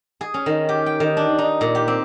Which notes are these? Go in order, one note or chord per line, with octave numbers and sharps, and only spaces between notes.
G#4
C#4
D#3
G4
G5
D#3
D4
D#4
A#2
G4
C4